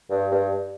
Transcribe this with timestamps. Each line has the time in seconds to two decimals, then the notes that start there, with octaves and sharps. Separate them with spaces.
0.10 G2
0.31 G2